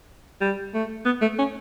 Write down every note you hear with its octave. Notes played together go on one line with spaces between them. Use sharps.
G3
A3
B3
A3
C#4